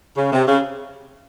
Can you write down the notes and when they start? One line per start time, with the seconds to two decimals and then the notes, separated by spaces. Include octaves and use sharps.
0.16 C#3
0.32 C3
0.47 C#3